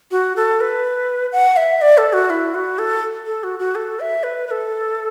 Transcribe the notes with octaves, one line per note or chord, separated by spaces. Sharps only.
F#4
A4
B4
F#5
E5
D5
A4
F#4
E4
F#4
A4
A4
F#4
F#4
A4
E5
B4
B4
A4